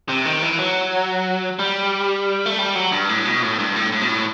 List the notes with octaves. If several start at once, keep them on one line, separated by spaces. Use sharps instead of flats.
C3
D#3
E3
F#3
G3
A3
G3
F#3
G2
A2
B2
A2
G2
A2
A2
B2
A2